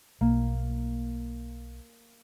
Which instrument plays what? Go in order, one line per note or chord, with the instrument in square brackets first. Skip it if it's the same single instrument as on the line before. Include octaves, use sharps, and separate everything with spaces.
[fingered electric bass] B1 [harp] A#3